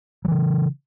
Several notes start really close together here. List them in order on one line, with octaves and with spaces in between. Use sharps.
F#3 E3 C#3